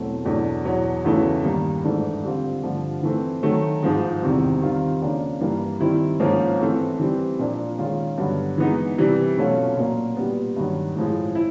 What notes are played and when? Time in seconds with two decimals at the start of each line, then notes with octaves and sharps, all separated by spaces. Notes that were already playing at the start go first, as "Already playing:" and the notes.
Already playing: E2 B2 F#3 A3 C4
0.25 E2 B2 F#3 A3 D4
0.65 E2 B2 F#3
1.04 E2 C#3 E3 A3
1.43 G2 D#3 G3 A#3 D#4
1.84 G#2 E3 A3 D4
2.23 D3 G3 C4 F4
2.63 G2 D3 F3 A3
3.03 E3 A3 C4
3.43 D#3 F#3 A3
3.83 G#2 F3 G#3
4.22 E2 C3 D#3 G3 C4
4.62 D#3 G3 C4 F4
5.02 C#3 F3 A#3 D4
5.41 G2 E3 G3 A#3
5.80 D#3 G3 C4 E4
6.20 G#2 F3 A#3 C#4
6.60 E3 A3 C4
7.00 E3 G3 C4
7.39 A#2 F3 A#3 D4
7.78 D#3 G#3 C#4 F4
8.18 G2 D3 F#3 B3
8.58 E3 G#3 B3 D#4
8.98 C3 E3 G3
9.37 B2 F#3 A3 C#4 F4
9.77 A#2 F#3 A#3
10.16 A#2 G3 B3
10.56 G2 D#3 F#3
10.96 A2 F3 G#3
11.35 E4